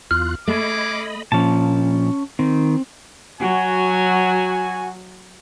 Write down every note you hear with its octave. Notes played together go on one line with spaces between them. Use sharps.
E2 F4 F6 F#6
A3 C#4 G#4 D#5 B5 D6
A#2 F3 C#4 A5
D#3 C4
F#3 F#4 G#5